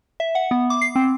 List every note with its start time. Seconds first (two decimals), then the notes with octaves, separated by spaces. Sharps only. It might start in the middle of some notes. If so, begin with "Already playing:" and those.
0.20 E5
0.35 F#5
0.51 B3
0.70 D6
0.81 C7
0.96 C4